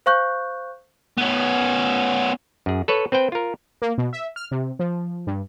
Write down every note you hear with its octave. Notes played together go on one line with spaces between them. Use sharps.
C5 F5 C#6 F#6 G6
B3 C#4
F#2 G#4
A4 B4 C#5
C4 B4 C5 G5
F4 A#4
A#3
B2
E5
F6
C3
F3
G2